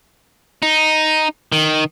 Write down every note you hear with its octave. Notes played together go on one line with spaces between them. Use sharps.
D#4
D#3